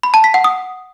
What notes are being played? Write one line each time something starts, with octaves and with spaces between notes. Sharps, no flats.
B5
A5
B6
F#5
D#6